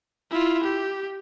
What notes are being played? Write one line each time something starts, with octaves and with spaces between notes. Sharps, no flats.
E4 F4
G4